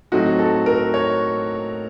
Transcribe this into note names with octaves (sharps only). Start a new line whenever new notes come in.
A2 F#3 A3 C4 D#4 F#4
A4
A#4
C#5